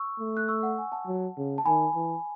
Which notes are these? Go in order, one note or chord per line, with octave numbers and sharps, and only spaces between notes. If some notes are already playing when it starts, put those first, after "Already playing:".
Already playing: C#6 E6
A3
F#6
C#6 E6
F#5
G#5
F#5 A5
F#3
C#3
A5
D#3 G#5 B5
E3